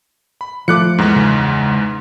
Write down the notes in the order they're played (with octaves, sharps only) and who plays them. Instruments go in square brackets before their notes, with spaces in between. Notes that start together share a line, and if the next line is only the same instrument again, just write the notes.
[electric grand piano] B5
[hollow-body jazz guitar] F3 A3 [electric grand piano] D6 F#6 C#7
[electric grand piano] E2 G#2
[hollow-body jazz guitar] C#2